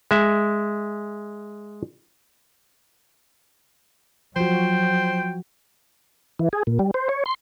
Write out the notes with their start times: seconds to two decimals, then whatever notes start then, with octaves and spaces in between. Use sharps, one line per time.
0.11 G#3 E5
4.36 F3 F#3 F#4 C5 G5
6.39 E3
6.53 G#4
6.67 A#2
6.79 G3
6.94 C5
7.09 C#5
7.26 C6